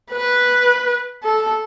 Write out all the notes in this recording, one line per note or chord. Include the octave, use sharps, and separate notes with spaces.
B4
A4